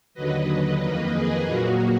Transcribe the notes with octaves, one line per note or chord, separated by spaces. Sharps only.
D#2 D3 F#3 B4 D#5
F2 D#3 A#3 B4 D#5
G#4 B4
A#2 F#3 A#3 F#4 A#4